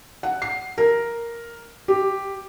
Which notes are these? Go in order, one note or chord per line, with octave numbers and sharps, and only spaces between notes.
F#5
C7
A#4
G4